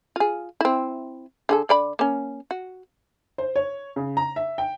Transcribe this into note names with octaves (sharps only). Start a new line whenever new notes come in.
F4 G#4
C4 E4
D3 G#4 A4
D3 D5 B5
A#3 C#4
F#4
C5
C#5
C#3
A#5
E5
G5